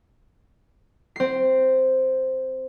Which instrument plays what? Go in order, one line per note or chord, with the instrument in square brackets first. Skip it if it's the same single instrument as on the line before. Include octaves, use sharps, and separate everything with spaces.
[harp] C4 C7